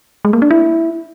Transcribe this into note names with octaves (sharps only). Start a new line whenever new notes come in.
G#3
A#3
D4
E4